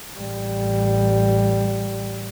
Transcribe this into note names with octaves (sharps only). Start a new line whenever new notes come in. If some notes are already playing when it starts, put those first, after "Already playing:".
A1 G3